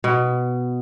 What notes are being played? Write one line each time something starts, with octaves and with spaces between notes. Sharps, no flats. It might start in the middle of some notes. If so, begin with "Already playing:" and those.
B2